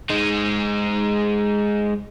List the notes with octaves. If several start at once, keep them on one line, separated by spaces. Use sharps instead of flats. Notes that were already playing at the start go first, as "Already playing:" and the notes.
G#3 D#4